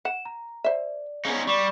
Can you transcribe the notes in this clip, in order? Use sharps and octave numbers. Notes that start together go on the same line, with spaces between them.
F#5 E7
A#5
C5 D5 E5
C#3 B3 C#4 D#4
G3 C#6 D6 E7